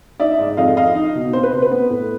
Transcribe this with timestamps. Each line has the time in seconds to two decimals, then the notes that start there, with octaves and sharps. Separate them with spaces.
0.20 D#4 D5 E5
0.38 G#2
0.57 F2 D#5 F5
0.76 F2 D#5 F5
0.95 D#4
1.15 B2
1.33 C4 C5
1.43 B4
1.52 C3 C5
1.62 B4
1.71 B3
1.90 A2